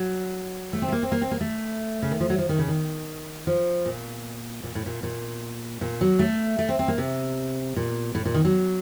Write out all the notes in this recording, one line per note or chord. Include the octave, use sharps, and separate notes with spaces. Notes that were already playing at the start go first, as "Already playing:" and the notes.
Already playing: F#3
A3
C4
A3
A#3
C4
A#3
C4
A#3
A3
C#3
D#3
F3
F#3
F3
D#3
C#3
D#3
F3
A#2
A#2
A2
A#2
A#2
A#2
F#3
A3
A3
C4
C4
A#3
C3
A#2
A2
A#2
D#3
F#3